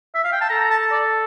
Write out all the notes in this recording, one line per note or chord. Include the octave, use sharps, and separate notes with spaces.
E5
F5
G5
A5
A4 A#5
A#5
A5
D5